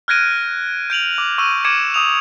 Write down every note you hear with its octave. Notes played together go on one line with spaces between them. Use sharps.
F6 F#6 G#6 A#6 D7 D#7
G6 D7 F7 F#7
D6
C#6 E6 D#7
D6 G#6 C#7 D7 E7
D6 D#6 F7